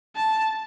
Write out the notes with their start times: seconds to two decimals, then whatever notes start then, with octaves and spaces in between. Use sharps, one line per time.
0.16 A5